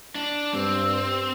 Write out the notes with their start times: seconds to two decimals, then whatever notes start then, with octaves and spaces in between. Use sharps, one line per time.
0.15 D4
0.54 G2 C4